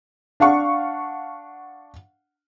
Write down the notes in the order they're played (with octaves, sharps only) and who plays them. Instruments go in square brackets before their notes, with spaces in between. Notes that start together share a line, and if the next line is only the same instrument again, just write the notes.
[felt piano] D4 F5 F#5 C#6